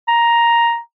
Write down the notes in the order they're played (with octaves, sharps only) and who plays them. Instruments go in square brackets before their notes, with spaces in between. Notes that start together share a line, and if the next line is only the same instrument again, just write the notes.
[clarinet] A#5